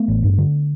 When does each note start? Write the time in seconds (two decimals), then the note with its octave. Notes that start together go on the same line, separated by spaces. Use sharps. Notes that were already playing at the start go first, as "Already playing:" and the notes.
Already playing: A3 B3
0.08 A1
0.23 G2
0.38 D3